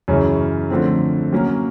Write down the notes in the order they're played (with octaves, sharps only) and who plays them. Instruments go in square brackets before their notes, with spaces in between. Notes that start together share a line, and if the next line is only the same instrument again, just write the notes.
[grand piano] F#2 C#3 E3 G#3 C#4
D3 F3 A3 C4
F#3 A#3 C#4